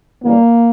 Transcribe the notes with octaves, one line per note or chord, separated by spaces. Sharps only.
F#2 C#3 E3 G3 A#3